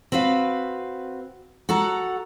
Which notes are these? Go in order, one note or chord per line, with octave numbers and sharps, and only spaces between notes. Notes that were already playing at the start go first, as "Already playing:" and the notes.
C4 F#4 B4 F5
F#4 A4 F#5 A#5